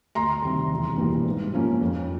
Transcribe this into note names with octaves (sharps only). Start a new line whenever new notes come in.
D2 A#5 C6
C3 D#3 G3
E1
E2 B2 G3 A#3
G#2
F3 A#3 C#4
F2